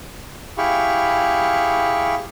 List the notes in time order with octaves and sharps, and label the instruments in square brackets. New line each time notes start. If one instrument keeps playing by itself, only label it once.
[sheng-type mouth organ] E4 G4 G#4 F5 B5 C#6